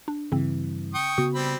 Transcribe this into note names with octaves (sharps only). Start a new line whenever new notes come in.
D4
G2 C#3 E3 C4
G5 C#6 D#6
C#3 B3 F#4
G3 C4 B5